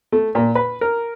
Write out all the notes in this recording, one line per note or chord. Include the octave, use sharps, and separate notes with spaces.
A3
A#2
B4
A#4